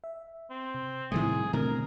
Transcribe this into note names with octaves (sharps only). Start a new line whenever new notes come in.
E5
C4
C3
A2 C3 D#3 G3 A3 E4 G#4
B2 D3 A3 C4 A#4